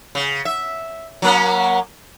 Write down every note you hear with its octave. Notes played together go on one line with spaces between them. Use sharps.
C#3
E5
F#3 A#3 C#4